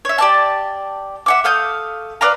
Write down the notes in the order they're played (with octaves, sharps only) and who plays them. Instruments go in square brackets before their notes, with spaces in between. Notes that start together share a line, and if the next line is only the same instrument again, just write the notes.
[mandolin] C#5 E5
G4 D5 A5
E5 F#5 D6
A3 F5 D#6 G6
B4 D5 F5 A#5